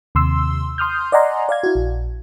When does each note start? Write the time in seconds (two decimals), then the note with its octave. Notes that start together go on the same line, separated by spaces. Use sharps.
0.15 D#2 C3 C6 E6
0.78 C6 D#6 F6 G6
1.12 D5 D#5 F#5 G#5 A#5 C6
1.49 D5 F5 G#6
1.63 E4 F#4
1.75 A#1